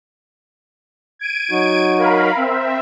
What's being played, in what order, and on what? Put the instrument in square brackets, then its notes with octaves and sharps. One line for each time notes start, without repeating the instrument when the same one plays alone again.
[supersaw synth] G#6 D7 D#7
[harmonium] F#3 D#4 F#4
[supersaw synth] A#4 F5 B5
C4 E5